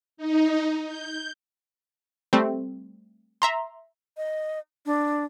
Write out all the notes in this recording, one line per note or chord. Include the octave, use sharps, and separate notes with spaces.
D#4
G6
G3 A3 C4
E5 A#5 C6
D#5
D4